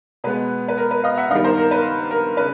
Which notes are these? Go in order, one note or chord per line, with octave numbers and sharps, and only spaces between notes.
B2 G#3 B3 B4
B4
A#4
B4
D#5 F5
E5 F#5
G2 D#3 G3 D#5 F5
A#4 C5
A#4
B4
A#4
C#3 B4